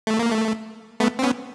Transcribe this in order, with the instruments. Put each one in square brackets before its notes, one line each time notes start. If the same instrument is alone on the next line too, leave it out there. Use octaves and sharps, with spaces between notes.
[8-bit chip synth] A3
A#3
A3
A3 B3
C4
B3 C#4